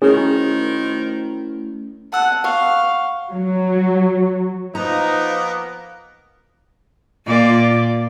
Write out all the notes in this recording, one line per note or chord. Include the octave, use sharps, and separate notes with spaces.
D#3 A3 C4 C#4 E4 F#4 G#4 A#4
F#5 A5 E6 F#6
F5 F#5 C#6
F#3
F3 A#3 B3 D#4 A#5
A#2 F4 D5